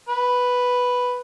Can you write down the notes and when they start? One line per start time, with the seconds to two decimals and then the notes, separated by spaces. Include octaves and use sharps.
0.09 B4